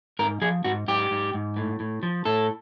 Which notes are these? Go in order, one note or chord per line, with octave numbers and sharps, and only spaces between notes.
G#2 A#4
F3 G#4
G#2 F#4
G#2 G4
G#2
G#2
A2
A2
F3
A2 A4